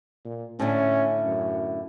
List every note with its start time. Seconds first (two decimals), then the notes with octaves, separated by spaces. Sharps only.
0.24 A#2
0.59 A2 D3 A3 C#4
1.26 F#2